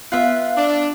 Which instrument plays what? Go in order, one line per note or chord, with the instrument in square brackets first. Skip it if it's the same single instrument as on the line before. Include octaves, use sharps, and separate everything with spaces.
[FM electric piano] B3 F5 F#6 [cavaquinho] F4 E5
[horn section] D4